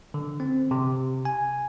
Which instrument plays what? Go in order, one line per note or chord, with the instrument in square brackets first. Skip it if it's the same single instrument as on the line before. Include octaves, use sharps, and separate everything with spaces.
[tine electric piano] D3
C4
C3
G#5